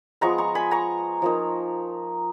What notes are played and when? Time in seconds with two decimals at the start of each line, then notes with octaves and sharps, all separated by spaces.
0.21 F3 G#3 B3 A#5 C#6
0.38 A#5 C#6
0.55 G#5 B5
0.71 A#5 C#6
1.22 F3 A#3 D#4